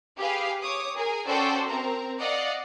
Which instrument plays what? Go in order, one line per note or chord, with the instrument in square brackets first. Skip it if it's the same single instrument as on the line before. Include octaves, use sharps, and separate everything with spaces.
[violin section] G4 G#4 B4 F5
C#5 D6 D#6
G#4 A#4 G#5
C#4 F#4 A4 C5 D5 G5
C4 A#4 A#5
D5 D#5 F5 F#5